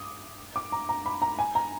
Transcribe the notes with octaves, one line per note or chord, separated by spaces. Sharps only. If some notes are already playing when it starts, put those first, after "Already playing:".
Already playing: D6 D#6
D6
A#5
A#5
B5
A#5
G#5
A#5